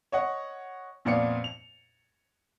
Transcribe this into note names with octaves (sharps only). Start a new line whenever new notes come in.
C#5 D#5 F#5
F2 A#2 B3 D5 F5 C#7
F7